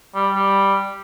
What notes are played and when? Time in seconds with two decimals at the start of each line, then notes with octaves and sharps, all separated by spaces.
0.15 G3
0.34 G3